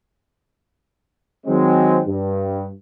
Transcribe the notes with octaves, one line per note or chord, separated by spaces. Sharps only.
D#3 F#3 G#3 C4
G2